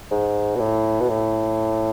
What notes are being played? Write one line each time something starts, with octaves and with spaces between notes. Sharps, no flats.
G#2
B2
A2
B2
A2